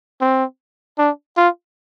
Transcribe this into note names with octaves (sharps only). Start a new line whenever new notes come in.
C4
D4
F4